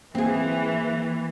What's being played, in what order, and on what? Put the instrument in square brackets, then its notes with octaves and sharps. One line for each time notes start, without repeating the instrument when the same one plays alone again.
[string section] E3 [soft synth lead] A#3 [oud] C4 G#4